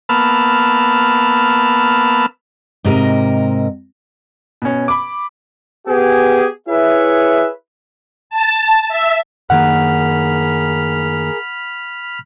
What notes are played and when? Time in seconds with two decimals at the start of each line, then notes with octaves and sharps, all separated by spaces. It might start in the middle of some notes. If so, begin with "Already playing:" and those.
0.09 A#3 B3 A5 B5 E6 F6
2.84 G#2 C3 A#4 D#5
4.62 B2 C#4
4.88 B5 D6
5.87 B3 G4 G#4
6.68 E4 G#4 B4 C#5 E5
8.30 A5
8.88 E5
9.50 F#2 D#3 A#3 G#4 A#4 F#5 B5 F6